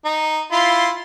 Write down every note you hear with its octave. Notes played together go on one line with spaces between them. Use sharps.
D#4
E4 F4 C6